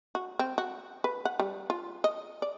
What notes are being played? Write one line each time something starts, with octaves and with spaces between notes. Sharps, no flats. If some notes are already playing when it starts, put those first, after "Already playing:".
F#4
C4
F#4
B4
F#5
G3
F4
D#5
D5